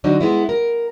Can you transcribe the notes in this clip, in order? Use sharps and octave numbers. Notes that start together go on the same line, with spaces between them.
D3 F#3 D4 D#4
G#3 B3 E4
A#4